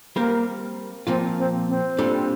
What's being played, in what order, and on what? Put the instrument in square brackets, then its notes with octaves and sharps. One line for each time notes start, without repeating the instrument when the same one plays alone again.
[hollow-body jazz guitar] G3 C4 G4 A#4 [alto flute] A#3
[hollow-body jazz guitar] A#2 F3 A#3 F4 [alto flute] C4
[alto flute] C4
C4
[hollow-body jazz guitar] A#2 G3 D4 A4